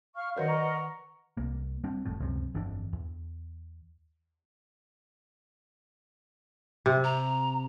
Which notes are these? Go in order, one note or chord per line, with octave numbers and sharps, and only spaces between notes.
F5 C#6 F6
F#2 D#3 A#4 B4 D5 D#5 F#5
A#5 C#6
C2 A#3
G3 C4 D4
F#1 F2 A2
C#2 F#2 C3
G1 F2 E3 D4
E2
C3
A#5